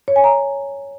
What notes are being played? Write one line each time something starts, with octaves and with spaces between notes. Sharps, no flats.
C#5
G#5
A#5